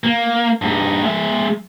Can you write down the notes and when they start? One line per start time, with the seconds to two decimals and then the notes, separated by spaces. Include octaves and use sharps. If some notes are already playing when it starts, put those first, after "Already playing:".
0.04 A#3
0.62 G2 D#4
1.03 G#3 E5